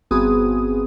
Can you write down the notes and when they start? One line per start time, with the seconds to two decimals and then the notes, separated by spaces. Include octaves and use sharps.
0.11 G1 B3 C4 F#4 G#4 D#6